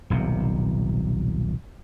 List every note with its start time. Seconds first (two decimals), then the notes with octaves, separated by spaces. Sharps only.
0.10 D#1 B1 C3